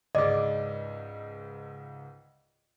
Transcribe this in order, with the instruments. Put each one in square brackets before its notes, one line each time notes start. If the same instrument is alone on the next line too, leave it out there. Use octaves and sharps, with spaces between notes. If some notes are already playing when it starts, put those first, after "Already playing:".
[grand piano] C#2 G#2 [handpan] D5 [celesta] D#5